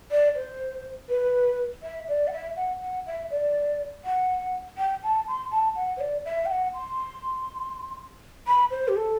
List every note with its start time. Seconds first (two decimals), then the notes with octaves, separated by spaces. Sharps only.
0.11 D5
0.36 C5
1.09 B4
1.83 E5
2.08 D5
2.28 F#5
2.32 E5
2.56 F#5
2.82 F#5
3.07 E5
3.30 D5
4.04 F#5
4.77 G5
5.03 A5
5.28 C6
5.51 A5
5.76 F#5
5.97 C5
6.00 D5
6.25 E5
6.46 G5
6.51 F#5
6.74 C6
8.47 B5
8.71 C5
8.88 G4
8.96 A4